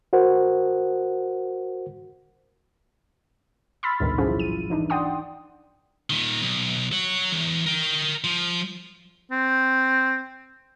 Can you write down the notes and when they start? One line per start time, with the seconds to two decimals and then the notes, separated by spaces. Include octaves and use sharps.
0.13 F#4 A#4 C5 F#5
3.83 B5 C6 E6 F6 A6 B6
4.00 A1 D2 G#2 B2 D#3 G3
4.18 F3 F#3 C#4 E4 F4 G#4
4.40 D#7
4.70 E3 D4 D#4
4.90 D5 F#5 G5 C6 D#6
6.10 A#2 D#3
6.42 B1
6.93 C#5 F#5
7.32 E2
7.66 A#4 G5
8.24 F3
9.32 C4